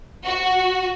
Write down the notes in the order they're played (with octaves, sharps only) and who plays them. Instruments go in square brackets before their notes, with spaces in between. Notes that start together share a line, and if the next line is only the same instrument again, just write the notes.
[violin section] F#4